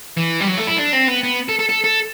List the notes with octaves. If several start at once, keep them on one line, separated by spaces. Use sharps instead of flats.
E3
G3
F#3
A3
E4
D4
C4
B3
B3
A4
A4
A4
A4